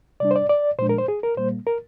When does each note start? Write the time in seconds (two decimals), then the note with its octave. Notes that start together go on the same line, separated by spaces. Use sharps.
0.20 C3 G3 D4 D5
0.31 C5
0.36 D5
0.49 D5
0.79 A#2 F3 G#3 D4 C5
0.89 A#4
0.98 C5
1.08 G#4
1.23 A#4
1.37 A#2 G3 A#3 C5
1.67 A#4